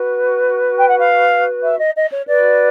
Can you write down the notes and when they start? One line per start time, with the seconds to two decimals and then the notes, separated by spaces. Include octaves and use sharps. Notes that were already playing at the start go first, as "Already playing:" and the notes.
Already playing: F#4 B4
0.78 G5
0.88 F#5
0.98 F5
1.62 E5
1.78 D#5
1.95 D#5
2.11 C#5
2.27 F#4 B4 D5